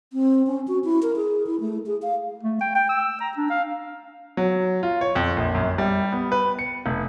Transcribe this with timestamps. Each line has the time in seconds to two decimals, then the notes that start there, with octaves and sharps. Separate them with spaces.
0.13 C4
0.47 C#4
0.68 F#4
0.84 E4
1.02 A#4
1.16 G#4
1.47 E4
1.60 A3
1.86 G#4
2.02 F5
2.43 A3
2.61 G5
2.75 G5
2.89 E6
3.20 A#5
3.37 D4
3.50 F5
4.37 F#3
4.83 F4
5.01 C#5
5.15 F2
5.36 A#1
5.55 F#2
5.78 G3
6.12 B3
6.32 B4
6.59 C#7
6.86 F1